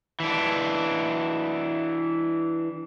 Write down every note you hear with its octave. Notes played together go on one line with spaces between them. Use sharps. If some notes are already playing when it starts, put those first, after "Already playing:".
E3 D4